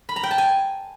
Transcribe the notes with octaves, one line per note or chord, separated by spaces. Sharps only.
B5
A#5
G5
A5
G#5